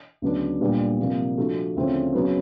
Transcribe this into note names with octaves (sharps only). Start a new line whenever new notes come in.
D2 C#3 F#3 B3 D4
A#2 G3 B3 D4
C3 F3 A#3
F3 A3 D4 F#4 A4
D2 C#3 F3 A3 C4
C#3 F#3 B3